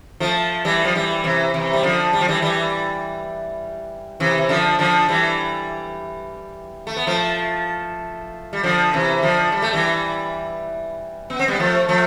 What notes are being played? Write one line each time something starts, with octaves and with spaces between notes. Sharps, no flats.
F3 A3
E3 G3
F3
E3 G3
C3 E3
C3 E3
G3
D3 F3
G3
F3
E3 G3
E3 G3
C3 E3
E3
D3 F3
D3 F3
E3 G3
A3
B3
F3 A3
G3
D3 F3
C3 E3
D3 F3
G3
A3
E3 G3
B3
C4
G3 B3
F3 A3
F3 A3